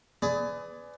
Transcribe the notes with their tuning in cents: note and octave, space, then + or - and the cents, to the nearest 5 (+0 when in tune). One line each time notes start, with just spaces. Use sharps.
G#4 +20 B4 +30 D5 +0